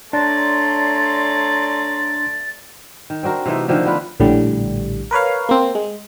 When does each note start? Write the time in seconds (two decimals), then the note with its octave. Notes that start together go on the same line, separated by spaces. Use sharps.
0.13 A3 D4 C#5 D5 A#5 C6 A6
3.10 D#3
3.23 C4 D4 F#4 A#4
3.46 C3 E3 A3 D#4
3.68 D3 D#3 F3 D#4
3.86 B3 D4 F4 B4
4.20 A#1 A2 D3 G3
5.11 A#4 B4 C#5 F5
5.49 A#3 C4
5.75 G#3